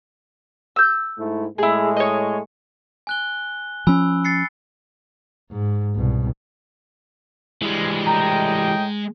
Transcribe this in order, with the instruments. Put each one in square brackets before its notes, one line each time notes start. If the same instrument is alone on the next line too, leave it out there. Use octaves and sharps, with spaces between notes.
[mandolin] E6 G6
[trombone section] G#2 A3 E4
[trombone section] A2 G#3 A3 [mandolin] E4 G#4
[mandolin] C#5 D#5
[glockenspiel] G#5 F#6 G7
[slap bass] F3 C#4 [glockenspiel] G#5 B5 E6
[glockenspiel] A6 C7 C#7
[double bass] G#2
C2 B2
[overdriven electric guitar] E3 G3 [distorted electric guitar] G#3
[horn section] A2 D#5 G5 [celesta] A#5